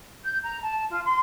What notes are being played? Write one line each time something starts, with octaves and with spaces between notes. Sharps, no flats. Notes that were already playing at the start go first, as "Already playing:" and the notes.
G6
A#5
A5
F4
C6